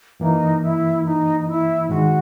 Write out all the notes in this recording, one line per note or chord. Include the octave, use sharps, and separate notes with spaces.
F#2 E3 A#3 D#4
E4
D#4
D#4
E4
G#2 D#3 G#3 F#4